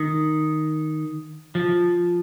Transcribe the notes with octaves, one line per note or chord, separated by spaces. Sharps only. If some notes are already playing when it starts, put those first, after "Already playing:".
Already playing: D#3
F3